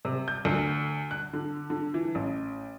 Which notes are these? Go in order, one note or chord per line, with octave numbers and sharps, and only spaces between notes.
C3
G6
D2
F#6
D3
D3
E3
A1